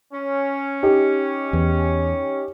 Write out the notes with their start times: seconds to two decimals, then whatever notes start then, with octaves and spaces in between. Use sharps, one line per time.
0.13 C#4
0.83 D#4 G4
1.53 E2